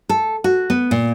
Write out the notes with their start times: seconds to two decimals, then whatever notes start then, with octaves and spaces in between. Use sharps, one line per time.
0.09 A4
0.44 F#4
0.70 B3
0.91 A#2